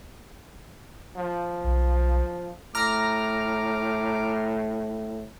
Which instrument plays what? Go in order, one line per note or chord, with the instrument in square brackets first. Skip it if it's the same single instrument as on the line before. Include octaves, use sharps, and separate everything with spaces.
[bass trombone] F3
[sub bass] B1
[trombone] A2 [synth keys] A#5 F6 [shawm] D6